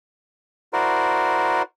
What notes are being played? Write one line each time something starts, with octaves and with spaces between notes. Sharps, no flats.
E4 F#4 A#4 C5 D5